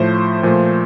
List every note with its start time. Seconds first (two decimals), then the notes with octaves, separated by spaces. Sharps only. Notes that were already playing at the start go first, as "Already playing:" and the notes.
Already playing: A2 F3 A3 C5
0.43 A#2 F3 A3